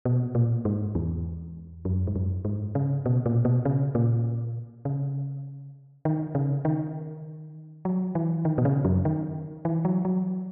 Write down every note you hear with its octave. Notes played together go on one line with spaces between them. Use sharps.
B2
A#2
G#2
E2
F#2
G#2
F#2
G#2
C#3
B2
A#2
B2
C#3
A#2
C#3
D#3
C#3
D#3
F#3
E3
D#3
B2
C#3
F#2
D#3
E3
F#3
F#3